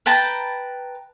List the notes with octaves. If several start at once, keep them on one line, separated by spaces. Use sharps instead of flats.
B4 G5 A5 A#5